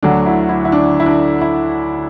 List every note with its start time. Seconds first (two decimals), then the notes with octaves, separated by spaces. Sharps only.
0.03 D2 D3 F#3 D4
0.26 E4
0.49 E4
0.65 E4
0.72 D4
1.00 E4
1.06 D4
1.42 E4